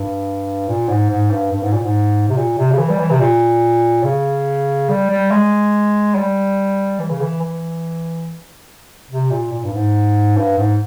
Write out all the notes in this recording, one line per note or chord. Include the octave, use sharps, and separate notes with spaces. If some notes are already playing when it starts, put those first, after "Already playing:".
Already playing: G2
A#2
G#2
G#2
G2
G2
G#2
A#2
G#2
C3
A#2
C3
C#3
E3
G3
E3
C3
A#2
C#3
G3
G3
G#3
G3
E3
C#3
E3
E3
C3
A#2
A#2
G2
G#2
G2
G#2